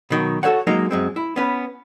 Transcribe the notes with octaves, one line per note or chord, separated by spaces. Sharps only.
B2 D#3 F#3
F#4 A4 C5 C#5 F#5
F#3 G#3 A#3 D#4 D#5
F#2 G#3 C4
E4
B3 C#4 B4